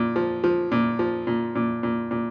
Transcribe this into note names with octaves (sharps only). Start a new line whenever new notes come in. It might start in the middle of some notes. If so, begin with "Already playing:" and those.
Already playing: A#2
F3
F3
A#2
F3
A#2
A#2
A#2
A#2